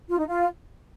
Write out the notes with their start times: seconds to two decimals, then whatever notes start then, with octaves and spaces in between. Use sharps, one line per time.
0.09 F4
0.18 D#4
0.27 F4